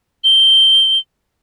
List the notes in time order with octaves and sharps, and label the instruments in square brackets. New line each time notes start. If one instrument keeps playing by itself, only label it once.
[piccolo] G7